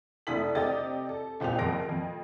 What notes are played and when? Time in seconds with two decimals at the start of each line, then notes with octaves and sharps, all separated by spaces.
0.27 F1 D4 E4 D#6 B6 F#7
0.55 C3 G4 D5 D#5 A6
1.09 A4
1.40 C#2 A#2 C4 G4 F7
1.58 F#1 F2 A#6 D7
1.89 F2